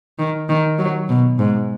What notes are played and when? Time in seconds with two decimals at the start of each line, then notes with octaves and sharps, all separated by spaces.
0.19 D#3
0.49 D#3
0.79 F#3
1.09 B2
1.39 G#2